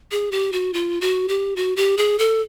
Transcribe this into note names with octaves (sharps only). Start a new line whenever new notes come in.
G#4
G4
F#4
F4
F#4
G4
F#4
G4
G#4
A4